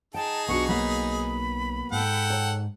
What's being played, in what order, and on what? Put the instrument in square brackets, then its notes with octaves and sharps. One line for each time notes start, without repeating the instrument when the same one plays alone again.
[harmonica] D#4 G#4 [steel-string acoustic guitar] G5 [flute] A5
[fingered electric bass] B1 [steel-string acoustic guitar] B3 D4 F#4 [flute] C#6
[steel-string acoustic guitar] F#3 A#3 B3 [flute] B5
[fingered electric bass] G#2 [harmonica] A4 F#5 G5
[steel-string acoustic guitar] C#5 A#5